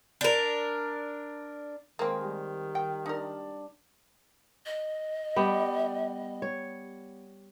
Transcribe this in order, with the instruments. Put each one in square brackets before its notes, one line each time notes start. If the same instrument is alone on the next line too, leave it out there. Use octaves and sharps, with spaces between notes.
[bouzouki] D4 A#4
[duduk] D#3 [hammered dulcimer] G#3 [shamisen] A#3 C4
[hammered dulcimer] G3
[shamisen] G5
[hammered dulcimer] D4 [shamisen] D#4 A#4
[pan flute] D#5
[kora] G3 B3 G4
C#5